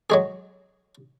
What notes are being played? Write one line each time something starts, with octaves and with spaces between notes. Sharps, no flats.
F#3 G#3 G#4